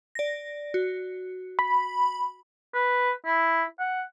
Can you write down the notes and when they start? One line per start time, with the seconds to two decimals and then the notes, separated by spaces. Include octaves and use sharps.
0.15 D5 A#6
0.74 F#4
1.59 B5
2.74 B4
3.26 E4
3.80 F#5